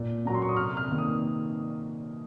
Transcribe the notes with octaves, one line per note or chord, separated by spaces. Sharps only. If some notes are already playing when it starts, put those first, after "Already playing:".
Already playing: A#2
F#3 A#3 C#4 A#5
C6
C#6
D#6
C3 F6
F6
D#3 A#3
D#6